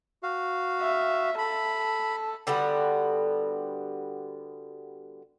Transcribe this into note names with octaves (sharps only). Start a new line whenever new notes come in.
F#4 F5
E5
A4 B5
D3 G3 B3 F#4